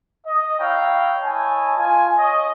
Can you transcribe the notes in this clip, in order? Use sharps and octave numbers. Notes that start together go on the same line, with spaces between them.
D#5
E4 C#5 F5 G5 A#5
E4 C#5 D#5 G#5 A5
F4 G#5
C#5 D#5